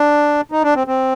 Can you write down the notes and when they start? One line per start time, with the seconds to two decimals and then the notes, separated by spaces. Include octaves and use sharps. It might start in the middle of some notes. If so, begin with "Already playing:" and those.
Already playing: D4
0.52 D#4
0.63 D4
0.75 C4
0.87 C4